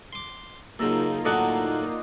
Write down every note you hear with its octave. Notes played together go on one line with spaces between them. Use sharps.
C6 D6
F#2 C#3 A#3 D#4 F4 A4 A#5
A2 D3 F#3 D5 D#5 F#5